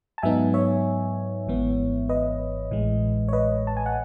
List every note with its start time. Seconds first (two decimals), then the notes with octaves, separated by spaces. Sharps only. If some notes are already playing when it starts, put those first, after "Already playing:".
0.18 A5
0.23 G#2 F#3 B3 D#4 E5 G#5
0.54 C#5 E5
1.47 G#1 G#2 E3 B3
2.09 B4 D#5
2.71 A1 A2 E3 G#3
3.28 C#5
3.33 B4 D#5
3.67 A5
3.77 G#5
3.86 F#5